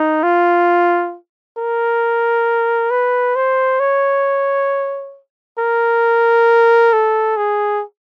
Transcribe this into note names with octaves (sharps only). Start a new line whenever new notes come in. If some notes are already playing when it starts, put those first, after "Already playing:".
Already playing: D#4
F4
A#4
B4
C5
C#5
A#4
A4
G#4